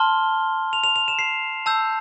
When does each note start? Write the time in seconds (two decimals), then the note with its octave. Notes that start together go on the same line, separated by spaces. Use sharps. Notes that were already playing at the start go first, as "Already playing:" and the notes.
Already playing: A5 C6 F6 G7
0.73 F7
0.84 F7
0.96 F7
1.08 E7
1.19 C7
1.66 A5 E6 G6